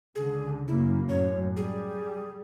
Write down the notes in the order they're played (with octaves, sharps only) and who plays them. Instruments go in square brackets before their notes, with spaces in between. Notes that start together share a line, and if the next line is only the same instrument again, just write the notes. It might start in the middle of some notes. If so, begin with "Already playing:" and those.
[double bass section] C#2 D3 [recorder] G#4
[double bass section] F#2 C#3 A#3 [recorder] E4
[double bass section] F#2 A2 [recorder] C#5
[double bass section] G3 [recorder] G#4